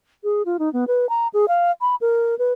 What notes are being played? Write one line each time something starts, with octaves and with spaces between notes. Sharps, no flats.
G#4
F4
D#4
B3
B4
A#5
G#4
F5
B5
A#4
B4